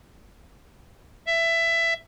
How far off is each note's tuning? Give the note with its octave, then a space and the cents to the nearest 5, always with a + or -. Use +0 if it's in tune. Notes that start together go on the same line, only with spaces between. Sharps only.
E5 +15